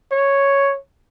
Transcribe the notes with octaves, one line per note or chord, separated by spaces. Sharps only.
C#5